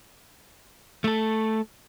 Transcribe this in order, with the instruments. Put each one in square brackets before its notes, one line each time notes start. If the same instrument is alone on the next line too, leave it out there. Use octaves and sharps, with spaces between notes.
[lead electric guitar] A3 A4